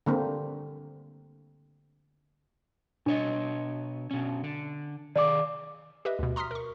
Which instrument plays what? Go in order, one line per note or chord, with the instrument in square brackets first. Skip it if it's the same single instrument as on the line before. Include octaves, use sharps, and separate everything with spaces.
[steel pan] D3 A#3 C4
[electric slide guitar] B2 C#5 D#5 [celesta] D4
[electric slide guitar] B2 C#4
D3
[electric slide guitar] D#3 G#4 F5 [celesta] D5 D6
[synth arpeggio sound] G4 B4 D#5 E5
D2 B2
A#5 C6 D#6 F6 B6
A#4 C#6